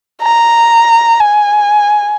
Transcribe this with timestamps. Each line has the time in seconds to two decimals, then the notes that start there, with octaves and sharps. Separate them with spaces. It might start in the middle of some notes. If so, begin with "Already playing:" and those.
0.22 A#5
1.20 G#5